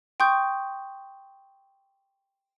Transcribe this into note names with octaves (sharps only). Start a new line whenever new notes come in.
G5 C6 C#6 D#6 G6